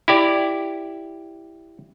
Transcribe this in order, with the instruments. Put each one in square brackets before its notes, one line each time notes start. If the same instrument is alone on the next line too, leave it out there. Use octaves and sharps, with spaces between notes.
[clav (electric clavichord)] E4 G4 D5